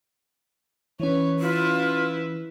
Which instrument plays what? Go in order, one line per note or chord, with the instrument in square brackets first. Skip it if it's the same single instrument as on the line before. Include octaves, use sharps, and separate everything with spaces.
[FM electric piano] E3 C#4 [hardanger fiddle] B4 C#5
[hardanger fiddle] E4 B4 [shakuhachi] F4